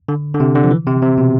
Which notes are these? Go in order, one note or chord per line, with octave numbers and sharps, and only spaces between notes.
D3
D3
C3
D3
F3
E3
C3
C3
B2